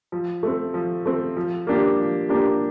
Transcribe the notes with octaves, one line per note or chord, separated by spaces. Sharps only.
F3
A3 C4
F3
A3 C4
F3
A#3 D4 G4
F3
A#3 D4 G4